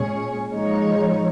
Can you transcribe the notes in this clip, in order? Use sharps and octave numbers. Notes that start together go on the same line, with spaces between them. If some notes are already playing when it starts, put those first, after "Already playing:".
Already playing: A#2 G#3 C#4 G#4 C#5
F3 G#3 D#4 C#5